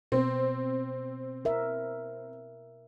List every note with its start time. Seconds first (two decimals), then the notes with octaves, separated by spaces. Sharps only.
0.12 B2 B3 C4
1.45 A#4 E5